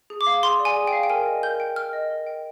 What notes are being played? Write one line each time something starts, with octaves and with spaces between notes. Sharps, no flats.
G#4
D6
F5
G#4 C6
D5
G#5
G#4
G5
F5
G5
A#4 G#5
D#5
A#4 G6
G5
A#4 F6
D#5
A#4
G5